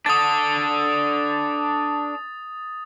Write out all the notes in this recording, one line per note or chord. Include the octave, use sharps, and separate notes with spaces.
D4 A4 D#6 A6